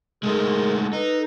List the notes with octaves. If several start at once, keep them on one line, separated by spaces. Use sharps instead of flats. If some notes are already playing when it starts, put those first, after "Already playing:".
G#3 A3 D#4 G#4 A#4
D#4 A4 B4